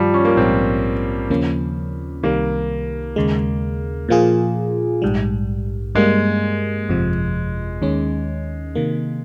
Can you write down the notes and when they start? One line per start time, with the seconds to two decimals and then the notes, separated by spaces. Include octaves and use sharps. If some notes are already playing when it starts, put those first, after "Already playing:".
Already playing: G2 D#3 F3 G3 F4
0.14 C#4
0.25 A#3
0.36 A#1 G#2 F3 C4
1.30 D#2 C#3 F3 A#3 C#4
2.23 C2 C3 D#3 G3 A#3
3.16 D#2 C#3 G#3
4.09 A#2 F3 A#3 F4 G#4
5.02 A#1 G#2 G3
5.95 G2 G3 G#3 A#3
6.89 G1 F2 C3 F3
7.82 D#2 D#3 G#3 C#4
8.75 C3 D#3 A#3